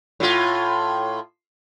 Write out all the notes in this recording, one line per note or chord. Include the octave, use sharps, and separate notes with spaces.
A2 F4